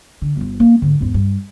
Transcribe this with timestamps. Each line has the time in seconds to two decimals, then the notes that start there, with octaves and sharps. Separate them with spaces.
0.22 D3
0.37 G1 F4
0.60 A#3 F4
0.82 G#2 D3
1.01 E2 G#2
1.14 G2